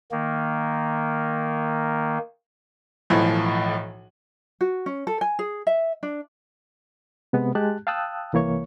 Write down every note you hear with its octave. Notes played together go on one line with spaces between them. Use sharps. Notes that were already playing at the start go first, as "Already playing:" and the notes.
D#3 A#3
B1 A2 E3 F3
F#4
C#4
A4
G#5
G#4
E5
D4
C3 G#3 B3
G#3 G4 A5 F#6
F5 G5 A5 D#6 E6 F#6
C2 E3 A#3 C#5 C#6